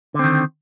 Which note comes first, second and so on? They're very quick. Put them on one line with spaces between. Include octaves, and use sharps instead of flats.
D3 C4 D#3